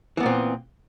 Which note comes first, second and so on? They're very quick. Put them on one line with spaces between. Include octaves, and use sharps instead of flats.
E3 B3 A#2 C4